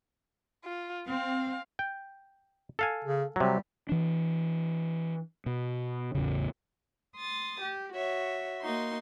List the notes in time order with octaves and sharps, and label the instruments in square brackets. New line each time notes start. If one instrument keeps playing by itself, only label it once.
[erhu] F4
[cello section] C4 [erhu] F5
[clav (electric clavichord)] G5
A4 F5 G#5
[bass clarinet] C#3
[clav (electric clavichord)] C3 F#3 [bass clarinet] G3
[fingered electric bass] E3 D4
B2
A1 E2 C#3
[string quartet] C6 D#6 A6
G4
F#4 C#5 E5
A#3 D#4 F#4 C6